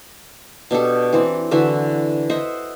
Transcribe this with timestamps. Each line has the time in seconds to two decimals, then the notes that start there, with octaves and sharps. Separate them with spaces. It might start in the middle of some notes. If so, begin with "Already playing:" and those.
0.71 B2 D4 G4 A4
1.13 E3 C4
1.51 D3 E3 F#4 E5
2.30 C5 D#5 E5 F#5